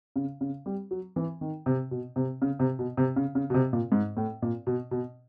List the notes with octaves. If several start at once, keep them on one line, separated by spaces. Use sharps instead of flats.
C#3
C#3
G3
F#3
E3
D#3
C3
B2
C3
C#3
C3
B2
C3
C#3
C#3
B2
C3
A#2
G#2
A2
A#2
B2
B2